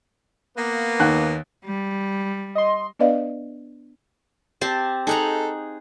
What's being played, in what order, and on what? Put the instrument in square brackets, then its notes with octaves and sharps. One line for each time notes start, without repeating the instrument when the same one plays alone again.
[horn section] A#3 B3
[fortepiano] D#2 F#6 [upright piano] D#4 F#5
[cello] G3
[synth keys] D#5 C6
[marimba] B3 D4 B4 D5 D#5 F5
[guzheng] C4 [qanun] G4 A5 C6
[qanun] D#4 [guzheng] G#4 F#5 A#5 [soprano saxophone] A4